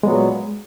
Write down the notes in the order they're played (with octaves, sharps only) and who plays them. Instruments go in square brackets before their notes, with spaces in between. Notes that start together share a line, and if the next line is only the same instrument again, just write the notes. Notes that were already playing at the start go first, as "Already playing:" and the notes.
[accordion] A#2 F#3 B3 [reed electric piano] G#3